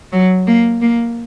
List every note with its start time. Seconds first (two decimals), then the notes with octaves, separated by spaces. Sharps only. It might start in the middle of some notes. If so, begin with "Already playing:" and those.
0.12 F#3
0.47 A#3
0.82 A#3